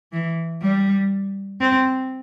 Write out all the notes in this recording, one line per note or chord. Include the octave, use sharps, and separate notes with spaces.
E3
G3
C4